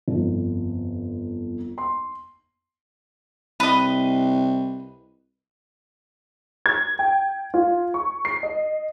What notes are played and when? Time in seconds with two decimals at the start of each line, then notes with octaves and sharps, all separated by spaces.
0.08 G1 F2
1.78 C6
3.60 C2 B4 D#5
6.66 G#6
6.99 G5
7.54 F4
7.94 C#6
8.25 C7
8.43 D#5